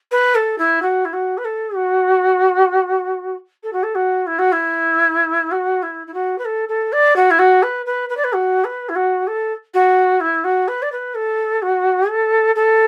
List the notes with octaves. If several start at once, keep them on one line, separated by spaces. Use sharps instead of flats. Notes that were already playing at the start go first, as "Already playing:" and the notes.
B4
A4
E4
F#4
E4
F#4
B4
A4
F#4
A4
F#4
A4
F#4
E4
F#4
E4
F#4
E4
E4
F#4
B4
A4
A4
D5
F#4
E4
F#4
B4
B4
B4
D5
B4
F#4
B4
E4
F#4
A4
F#4
E4
F#4
B4
D5
B4
A4
F#4
A4
A4